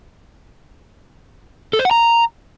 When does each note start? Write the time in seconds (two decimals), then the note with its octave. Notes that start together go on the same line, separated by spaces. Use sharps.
1.73 A4
1.79 C5
1.85 F#5
1.91 A#5